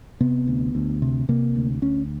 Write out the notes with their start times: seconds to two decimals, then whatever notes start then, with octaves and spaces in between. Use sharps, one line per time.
0.21 C3 B3
0.47 D2
0.75 D2
1.02 C3
1.29 C3 A#3
1.56 D2
1.82 D2 C#4